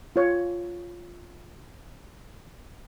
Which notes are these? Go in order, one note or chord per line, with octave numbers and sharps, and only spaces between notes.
F4 C#5